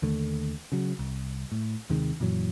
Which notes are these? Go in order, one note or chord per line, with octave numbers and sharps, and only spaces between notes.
D#2 D3 A3
C#3 F#3
C2
A2
D#2 C3 D#3 G#3
F#2 A#2 E3 F#3